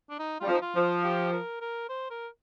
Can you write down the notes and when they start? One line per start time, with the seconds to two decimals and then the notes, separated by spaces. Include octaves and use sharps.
0.10 D4
0.19 D#4
0.40 G3 F4
0.48 F3
0.54 D#4
0.62 F4
0.76 F3
0.83 F4
1.04 G4
1.33 A#4
1.61 A#4
1.89 C5
2.10 A#4